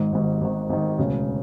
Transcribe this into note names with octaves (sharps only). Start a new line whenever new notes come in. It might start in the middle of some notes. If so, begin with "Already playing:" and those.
Already playing: G#1 G#2 D#3
G#1 G#2 D#3
G#1 G#2 D#3
G#1 G#2 D#3
E1 D2 C#3